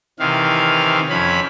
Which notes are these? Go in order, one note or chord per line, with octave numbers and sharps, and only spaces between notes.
C3 D#3 E3 F5
F2 C#4 B5